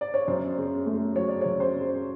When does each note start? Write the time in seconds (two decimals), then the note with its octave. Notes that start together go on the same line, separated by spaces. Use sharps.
0.01 D5
0.14 C#5
0.28 F#2 C5
0.57 C#3
0.86 A3
1.16 F#3 C#5
1.29 D5
1.41 F#2 C#5
1.60 C5
1.75 C#3